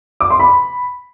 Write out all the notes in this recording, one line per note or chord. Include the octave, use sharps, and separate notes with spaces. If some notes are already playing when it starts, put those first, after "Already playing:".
D6
C6
B5